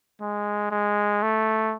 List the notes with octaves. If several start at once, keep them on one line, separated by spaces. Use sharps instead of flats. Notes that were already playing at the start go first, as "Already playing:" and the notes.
G#3
G#3
A3